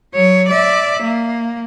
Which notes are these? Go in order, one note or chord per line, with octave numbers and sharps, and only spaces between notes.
F#3 C#5
D5 E5
A#3